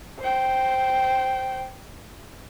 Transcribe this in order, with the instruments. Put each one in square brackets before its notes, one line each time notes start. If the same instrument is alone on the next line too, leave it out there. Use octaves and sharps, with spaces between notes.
[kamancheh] C5 G5